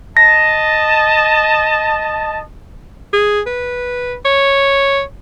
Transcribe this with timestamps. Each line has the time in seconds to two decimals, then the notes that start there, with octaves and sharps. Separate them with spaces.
0.17 D#5 A5 A#6
3.13 G#4
3.46 B4
4.25 C#5